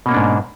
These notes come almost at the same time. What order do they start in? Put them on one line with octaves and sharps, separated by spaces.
B2 A#3 C#4 D4 G#2